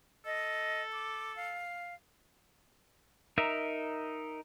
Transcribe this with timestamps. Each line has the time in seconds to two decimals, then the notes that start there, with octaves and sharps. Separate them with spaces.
0.26 A4 D#5
0.92 D6
1.36 F5
3.38 D#4 A#4 E5